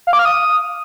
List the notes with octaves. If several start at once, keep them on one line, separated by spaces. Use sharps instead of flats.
F5
D6
F6
D#6